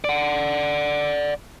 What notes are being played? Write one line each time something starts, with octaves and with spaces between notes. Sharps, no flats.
D5 F#5